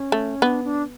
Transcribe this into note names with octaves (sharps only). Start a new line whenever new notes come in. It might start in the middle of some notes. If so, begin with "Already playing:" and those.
Already playing: C#4
A3
B3 D4
D4